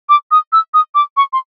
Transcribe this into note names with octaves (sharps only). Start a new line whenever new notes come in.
D6
D#6
E6
D#6
D6
C#6
C6